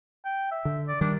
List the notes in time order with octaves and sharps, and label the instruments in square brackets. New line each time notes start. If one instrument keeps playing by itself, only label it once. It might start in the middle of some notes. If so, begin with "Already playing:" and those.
[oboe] G5
E5
[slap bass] D3
[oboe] D5
[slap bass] D#3 G3 [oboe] D4